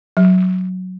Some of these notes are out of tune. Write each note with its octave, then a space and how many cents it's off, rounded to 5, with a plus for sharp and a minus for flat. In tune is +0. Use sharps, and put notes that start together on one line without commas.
F#3 +0